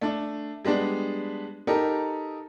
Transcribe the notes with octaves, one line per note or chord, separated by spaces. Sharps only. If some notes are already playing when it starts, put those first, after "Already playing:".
A3 D4
G3 G#3 B3 D4
D#4 G4 A4 A#4